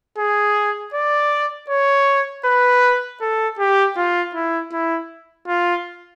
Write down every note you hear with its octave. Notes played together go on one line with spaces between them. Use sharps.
G#4
D5
C#5
B4
A4
G4
F4
E4
E4
F4